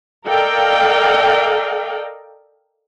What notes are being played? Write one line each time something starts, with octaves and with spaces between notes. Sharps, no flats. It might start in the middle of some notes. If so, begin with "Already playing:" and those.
A4 A#4 D5 D#5 F5 G5